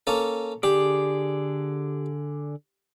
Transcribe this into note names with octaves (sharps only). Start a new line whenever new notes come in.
A#3 C#4 A4
D3 G4 G#4 D5